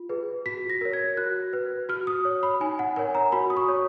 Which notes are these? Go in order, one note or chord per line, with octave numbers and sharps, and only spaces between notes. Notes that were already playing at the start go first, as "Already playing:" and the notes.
Already playing: F4
G#4 B4
F#4 B6
A#6
A#4 C#5
G#6
F#4 F#6
B4
F#4 F6
D#6
C#5
B5
D#4 G#5
F#5
A#4 C#5 G#5
A#5
F#4 B5
D#6
C#6
C#5